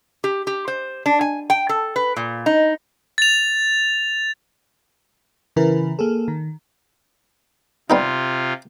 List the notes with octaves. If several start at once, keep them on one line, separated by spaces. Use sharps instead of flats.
G4
G4
C5
D4
G#5
G5
A4
B4
A#2
D#4
A6 F7
C#3 E3 E4 A#4 B4
A#3 G#4 A4
D#3
C3 G3 B3 D#4 F4